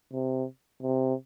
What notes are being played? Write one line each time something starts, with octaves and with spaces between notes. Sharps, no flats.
C3
C3